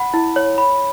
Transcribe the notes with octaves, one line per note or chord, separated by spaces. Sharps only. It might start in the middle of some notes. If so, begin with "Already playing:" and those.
Already playing: F#5 B5
E4
C#5
B5